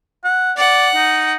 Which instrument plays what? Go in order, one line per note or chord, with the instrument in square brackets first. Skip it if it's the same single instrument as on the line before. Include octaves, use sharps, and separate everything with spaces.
[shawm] F#5
[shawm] D5 [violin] F#5
[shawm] D#4